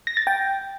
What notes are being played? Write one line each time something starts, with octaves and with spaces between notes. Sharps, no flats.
A#6
A6
G5